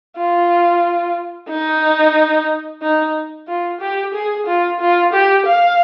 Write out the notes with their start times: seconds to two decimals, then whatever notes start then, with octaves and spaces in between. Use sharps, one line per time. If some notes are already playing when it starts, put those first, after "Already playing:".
0.17 F4
1.49 D#4
2.82 D#4
3.48 F4
3.81 G4
4.14 G#4
4.47 F4
4.80 F4
5.13 G4
5.46 F5